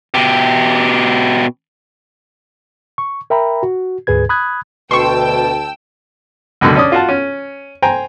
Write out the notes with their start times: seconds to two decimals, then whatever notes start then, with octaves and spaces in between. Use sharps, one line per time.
0.14 B2 G4
2.98 C#6
3.30 A#4 E5 G5 A#5 B5
3.63 F#4
4.07 D2 G#2 G#4 B4 G#6
4.29 B5 D#6 F#6 G#6
4.91 D2 B2 G5 A5 C6 C#6 E6
6.61 C#2 F#2 B2 D3
6.76 C#4 D4 D#6
6.92 F4 F#4 A5
7.09 C#4
7.82 C5 G5 G#5 A#5